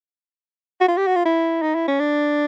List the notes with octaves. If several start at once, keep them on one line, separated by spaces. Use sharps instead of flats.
F#4
F4
G4
F#4
F4
E4
D#4
E4
C#4
D4